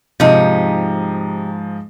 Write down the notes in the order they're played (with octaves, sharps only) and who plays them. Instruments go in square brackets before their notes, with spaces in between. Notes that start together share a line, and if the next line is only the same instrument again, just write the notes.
[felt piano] G#2 F3 [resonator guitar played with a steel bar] C3 D#4